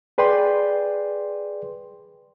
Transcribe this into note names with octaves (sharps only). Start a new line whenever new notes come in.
G#4 B4 D5 G5 C6